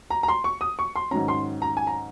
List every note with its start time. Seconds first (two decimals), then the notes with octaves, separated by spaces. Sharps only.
0.10 A#5
0.23 A#5
0.28 C6
0.44 C#6
0.61 D#6
0.79 C#6
0.96 C6
1.11 G#2 D#3 F#3 C#4 A#5
1.28 C6
1.62 A#5
1.77 G#5
1.87 A#5